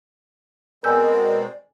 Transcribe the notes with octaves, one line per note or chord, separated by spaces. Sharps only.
B2 G#3 C4 A#4 D5 G#5 E6 G6